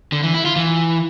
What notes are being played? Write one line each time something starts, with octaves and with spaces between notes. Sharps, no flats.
D3
E3
E4
F4
E3